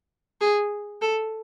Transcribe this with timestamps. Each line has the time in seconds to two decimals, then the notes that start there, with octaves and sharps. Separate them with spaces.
0.41 G#4
1.01 A4